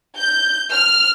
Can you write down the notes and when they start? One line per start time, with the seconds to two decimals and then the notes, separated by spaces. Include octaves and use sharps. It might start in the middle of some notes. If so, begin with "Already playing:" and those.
0.17 G6
0.72 F6